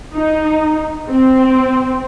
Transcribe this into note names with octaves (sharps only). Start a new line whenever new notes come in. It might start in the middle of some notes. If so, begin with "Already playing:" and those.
D#4
C4